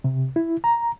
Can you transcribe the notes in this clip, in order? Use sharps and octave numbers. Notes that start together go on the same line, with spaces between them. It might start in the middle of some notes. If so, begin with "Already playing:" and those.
C3
E4
A#5